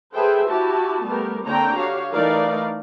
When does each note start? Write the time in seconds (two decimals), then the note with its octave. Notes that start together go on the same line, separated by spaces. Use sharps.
0.14 G#4 A4 B4 C5 E5 G5
0.47 E4 F#4 G4 A5
1.05 G3 A3 B3 G4 A#4
1.46 D3 A#3 C4 C#5 G5 A#5
1.75 F#4 G4 C#5 F5
2.13 E3 A3 D#4 A#4 D5 F5